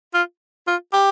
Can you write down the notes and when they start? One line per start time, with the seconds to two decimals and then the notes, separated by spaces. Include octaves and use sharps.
0.14 F4
0.67 F4
0.93 G4